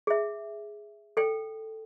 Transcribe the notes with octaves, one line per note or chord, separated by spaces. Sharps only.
G#4 E5
A4 G5